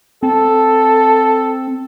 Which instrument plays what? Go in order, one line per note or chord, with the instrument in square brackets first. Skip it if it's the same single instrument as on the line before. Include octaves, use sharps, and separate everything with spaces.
[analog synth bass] C4 [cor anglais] A4